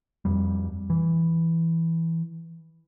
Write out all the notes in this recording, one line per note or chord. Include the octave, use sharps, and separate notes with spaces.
F2 G3
E3